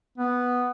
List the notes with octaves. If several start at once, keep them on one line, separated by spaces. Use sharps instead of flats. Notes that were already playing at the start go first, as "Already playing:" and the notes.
B3